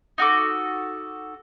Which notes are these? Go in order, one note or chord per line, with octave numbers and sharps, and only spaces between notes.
D#4 F#4 A4 D6